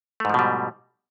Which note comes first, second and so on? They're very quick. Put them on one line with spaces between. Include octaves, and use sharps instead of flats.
A3 G#2 F3 B2 G3